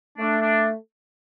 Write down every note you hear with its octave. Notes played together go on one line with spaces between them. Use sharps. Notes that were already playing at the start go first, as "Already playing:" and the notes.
A3 D4
D4